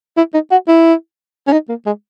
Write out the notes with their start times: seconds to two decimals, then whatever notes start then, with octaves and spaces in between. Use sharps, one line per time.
0.17 E4
0.34 D#4
0.52 F#4
0.68 E4
1.47 C#4
1.52 D#4
1.69 A#3
1.86 G#3